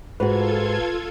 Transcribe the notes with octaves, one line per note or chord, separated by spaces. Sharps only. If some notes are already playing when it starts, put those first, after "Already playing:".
G#2 F4 F#4 A4 B4 G#6